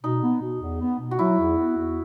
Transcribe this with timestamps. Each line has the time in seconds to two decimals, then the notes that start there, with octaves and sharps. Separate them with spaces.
0.03 B2 D#4
0.23 B3
0.41 B2
0.61 E2
0.81 B3
1.00 B2
1.11 F#4
1.19 F#3 E4
1.39 E2
1.58 B3
1.77 E2